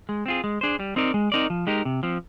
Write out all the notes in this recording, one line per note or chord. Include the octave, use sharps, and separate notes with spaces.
G#3
C4 F4 G#4
G#3
D4 G#4 C5
G3
C4 D#4 A#4 D5
G#3
C4 D#4 A#4 D5
F3
G#3 D#4 G4 A#4
C3
F3 C4